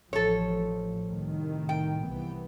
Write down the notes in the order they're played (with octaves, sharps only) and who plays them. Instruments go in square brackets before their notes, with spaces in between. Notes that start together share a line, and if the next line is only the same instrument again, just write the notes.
[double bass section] A1 A2 F3 [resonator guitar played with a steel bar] A4 C#5
[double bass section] C2 A2 D#3
[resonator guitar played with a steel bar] G5
[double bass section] C2 E3 B3